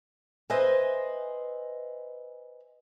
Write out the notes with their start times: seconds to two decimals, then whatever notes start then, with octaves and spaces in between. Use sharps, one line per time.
0.50 B4 C5 D#5 E5 G#5